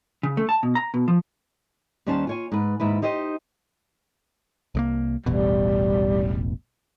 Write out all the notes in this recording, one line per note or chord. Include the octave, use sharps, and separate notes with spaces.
C#3
A3
A5
B2
A#5
B2
F3
D#2 G3 C#4 C5 F5 A5
F4 C#5 G#5
G#2 B4
D#2 G#2 E4 B4
D#4 G4 C5 D#5
C2 G#3 A#3
E1 A1 B2 G3